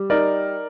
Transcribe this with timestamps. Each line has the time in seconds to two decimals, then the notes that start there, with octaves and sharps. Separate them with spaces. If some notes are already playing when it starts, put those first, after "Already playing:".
Already playing: G3
0.10 D#4 A#4 D5